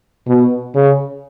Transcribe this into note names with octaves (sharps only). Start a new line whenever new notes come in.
B2
C#3